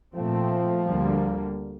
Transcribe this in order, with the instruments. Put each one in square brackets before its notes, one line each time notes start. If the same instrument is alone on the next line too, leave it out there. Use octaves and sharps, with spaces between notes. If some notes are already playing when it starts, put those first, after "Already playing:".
[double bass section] A#2 A3 C4 [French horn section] F3
[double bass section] D2 D3 G3 A#3